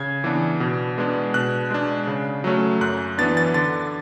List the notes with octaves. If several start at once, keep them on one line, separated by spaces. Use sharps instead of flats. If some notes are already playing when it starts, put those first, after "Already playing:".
Already playing: C#3 G#6
E3 B3 D4
B2
G#3 B3 D4
B2 F#6
G#3 D4
C#3
F#3 A3 C#4
F#2 F#6
E3 B3 D4 A6
A6
D3 A6